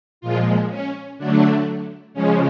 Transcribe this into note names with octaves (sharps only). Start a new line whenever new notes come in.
A#2 F3 G#3 F4
C#4
D3 F#3 A3 D4
C#3 F3 G#3 C#4